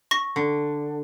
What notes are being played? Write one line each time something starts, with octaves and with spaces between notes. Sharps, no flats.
C#6 A#6
D3